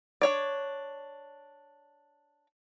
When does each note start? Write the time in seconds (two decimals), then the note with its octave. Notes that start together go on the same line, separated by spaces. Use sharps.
0.22 D4 C#5 D5